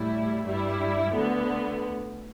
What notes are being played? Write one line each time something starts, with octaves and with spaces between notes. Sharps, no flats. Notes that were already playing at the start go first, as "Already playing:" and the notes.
Already playing: A2 G3 E4
G2 G3 E4
D2 D3 B3